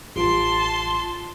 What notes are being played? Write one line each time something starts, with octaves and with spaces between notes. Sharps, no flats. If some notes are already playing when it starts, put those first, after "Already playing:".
A1 F4 A5 C6